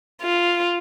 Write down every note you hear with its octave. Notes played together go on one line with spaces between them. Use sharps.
F4